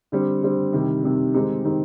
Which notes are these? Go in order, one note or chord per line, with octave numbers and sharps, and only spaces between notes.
D3 G3 C4
D3 G3 C4
C3 D#3 G3
C3 D#3 G3
D#3 G#3 C4 D#4 G4
D#3 G#3 C4 D#4 G4